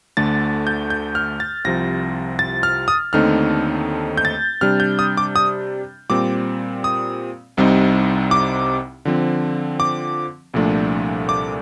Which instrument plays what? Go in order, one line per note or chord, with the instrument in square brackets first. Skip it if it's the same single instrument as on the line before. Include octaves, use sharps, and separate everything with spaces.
[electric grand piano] D2 D3 A3 A6
G6
G6
F6
A6
C2 C3 F3 A#6
A6
F6
D#6
D#2 D3 A3 C4 D#4 F6
G6
A6
C3 G3 D4 F6
G6
D#6
D6
D#6
A#2 G3 C4 D6
D#6
C2 C3 G3 C4 D#4
D6
D3 F3 C4
D6
C2 A#2 F3 A3 D4
D6